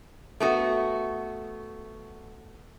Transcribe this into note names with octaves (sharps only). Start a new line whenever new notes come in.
A3 B3 F#4